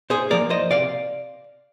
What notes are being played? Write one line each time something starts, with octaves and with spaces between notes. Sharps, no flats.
G#4 C5
F3 A#3 A#4 D5
C5 D#5
C3 D5 F5